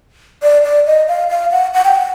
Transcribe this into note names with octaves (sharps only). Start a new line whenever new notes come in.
D5
D5
D#5
F5
F5
F#5
F#5
G5
F#5